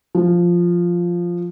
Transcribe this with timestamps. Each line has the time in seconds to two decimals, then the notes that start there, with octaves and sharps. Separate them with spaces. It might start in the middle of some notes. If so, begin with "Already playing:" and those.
0.15 F3